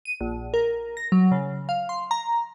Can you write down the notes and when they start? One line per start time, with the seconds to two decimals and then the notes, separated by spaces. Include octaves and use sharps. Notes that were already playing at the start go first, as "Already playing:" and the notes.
0.05 D#7
0.21 A#1
0.54 A#4
0.97 A#6
1.12 F#3
1.31 C#3
1.69 F5
1.89 C6
2.11 A#5